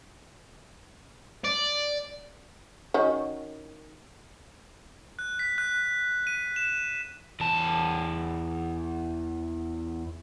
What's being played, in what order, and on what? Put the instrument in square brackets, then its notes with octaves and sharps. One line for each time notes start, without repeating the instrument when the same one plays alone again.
[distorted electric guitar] D5
[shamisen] D#3 C#4 F#4
[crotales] F#6
B6
F#6
D#7
E7
[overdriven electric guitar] E2 A5